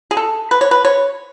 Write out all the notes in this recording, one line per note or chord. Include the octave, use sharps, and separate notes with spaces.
G#4
A4
B4
C#5
B4
C#5